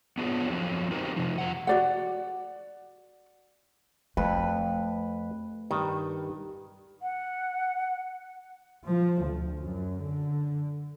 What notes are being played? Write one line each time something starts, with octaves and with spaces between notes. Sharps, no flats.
B3 D4 F4 G4 G#4 C#5
F3 F#3 C4
C4 D#4 F#4 G4 A#4 C5
C3 F3
F3 F#5
F#4 D5 F#5
F2 A3 B4
G2 D#3
F#5
F3
D2
F#2
D3